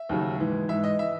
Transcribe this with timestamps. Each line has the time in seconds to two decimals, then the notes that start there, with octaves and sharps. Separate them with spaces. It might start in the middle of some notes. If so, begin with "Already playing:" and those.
Already playing: E5
0.09 D#2 C#3 F#3
0.39 G#2 E3
0.68 G#2 E3 E5
0.84 D#5
0.99 E3 E5